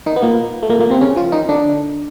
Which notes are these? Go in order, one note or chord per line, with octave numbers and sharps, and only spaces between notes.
D#3 D#4
B3
A#2 A#3
A3
A#2 A#3
A#2 A#3
C3 C4
C#3 C#4
F3 F4
D#3 D#4
D3 D4